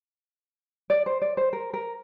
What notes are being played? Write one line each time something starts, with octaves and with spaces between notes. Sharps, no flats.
D5
C5
D5
C5
A#4
A#4